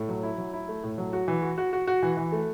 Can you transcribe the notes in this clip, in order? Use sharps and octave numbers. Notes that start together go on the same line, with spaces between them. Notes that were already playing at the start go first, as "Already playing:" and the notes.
Already playing: A2
F#3
E4
F#3
E4
A3
A2
F#3
F#4
E3
F#4
F#4
F#4
F#4
E3
E3
A3